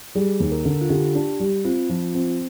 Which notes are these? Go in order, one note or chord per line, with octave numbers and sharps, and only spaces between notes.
G3 G#4
D#2
A#4
D3
F4
D3 G4
D4
G3
C4 F4
F3
C4